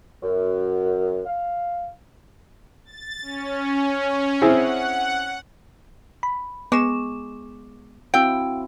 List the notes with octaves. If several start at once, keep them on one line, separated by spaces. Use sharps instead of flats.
F#2
F5
A6
C#4
C4 E4 G#4 F#5
B5
G#3 B3 C#6 D6 E7
C4 E4 F#4 F5 G5 E6